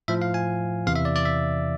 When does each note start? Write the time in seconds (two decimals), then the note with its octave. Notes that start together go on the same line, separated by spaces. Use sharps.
0.08 A2 F3 E5
0.22 F5
0.34 G#5
0.86 E2 C3 E3 F5
0.96 E5
1.05 D5
1.16 D5
1.25 E5